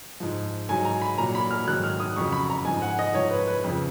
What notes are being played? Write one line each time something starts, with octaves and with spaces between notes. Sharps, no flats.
G#2 F3
G#2 F#3 G#5
A#5
B5
A#2 F#3 A#5
B5
F6
G#2 D#3 F#3 F#6
F6
D#6
F2 C#3 F#3 C#6
B5
A#5
G#2 F3 G#5
F#5
D#5
G#2 F3 C#5
B4
B4
F2 C#3 F3